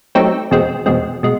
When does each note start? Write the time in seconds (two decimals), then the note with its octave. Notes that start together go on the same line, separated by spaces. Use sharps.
0.15 F#3 A3 C4 D#4 G4
0.51 E2 B2 G#3 C4
0.86 E2 B2 G#3 C4
1.23 B2 G#3